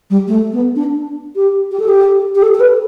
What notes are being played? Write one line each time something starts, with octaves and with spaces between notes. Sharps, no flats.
G3
A3
B3
D4
G4
G4
A4
G4
G4
A4
A4
B4